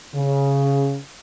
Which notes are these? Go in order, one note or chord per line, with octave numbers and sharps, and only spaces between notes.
C#3